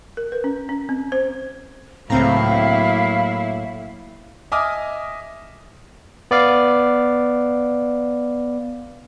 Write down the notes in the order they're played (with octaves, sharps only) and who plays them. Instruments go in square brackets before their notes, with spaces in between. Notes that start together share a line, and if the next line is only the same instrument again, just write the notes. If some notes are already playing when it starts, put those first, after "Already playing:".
[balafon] A#4
B4
C#4
C#4
C4
C5
[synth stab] C#2 C4 A#5 [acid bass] A2 [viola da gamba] F#3 A#3 E4 [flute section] F5
[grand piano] D#5 E5 G#5 D6 D#6 F6
[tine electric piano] B3 D5 F5